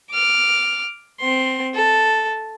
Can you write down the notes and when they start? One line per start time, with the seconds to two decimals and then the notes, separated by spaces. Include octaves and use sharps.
0.12 D6 F6
1.21 C4 C6
1.75 A4